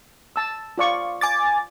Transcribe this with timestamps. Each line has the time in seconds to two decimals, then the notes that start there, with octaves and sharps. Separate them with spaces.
0.36 A5 E6
0.78 F4 D5 C#6
1.21 G#5 D6 A6